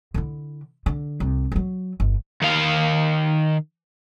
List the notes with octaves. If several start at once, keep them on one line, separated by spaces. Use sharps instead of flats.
D3 E4
D3
C2
F3 F#3
G1
D#3 F5